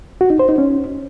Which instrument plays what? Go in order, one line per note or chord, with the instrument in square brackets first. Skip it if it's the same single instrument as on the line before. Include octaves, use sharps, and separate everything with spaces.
[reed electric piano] F#4
D#4
C5
D#4
C#4